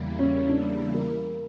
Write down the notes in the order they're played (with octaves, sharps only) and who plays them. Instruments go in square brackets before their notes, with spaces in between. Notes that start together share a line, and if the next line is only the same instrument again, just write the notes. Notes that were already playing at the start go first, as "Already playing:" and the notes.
Already playing: [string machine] E2 C#3 G3 A#3 E4
[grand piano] C#4
D4
A#4